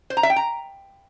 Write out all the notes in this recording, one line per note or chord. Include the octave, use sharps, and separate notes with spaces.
C5
A#5
E5
G5
A#5